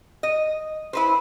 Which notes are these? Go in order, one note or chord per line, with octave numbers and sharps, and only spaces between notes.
D#5
E4 B4 C5